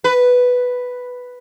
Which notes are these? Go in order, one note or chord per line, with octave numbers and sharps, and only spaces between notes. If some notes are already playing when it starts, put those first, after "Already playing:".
B4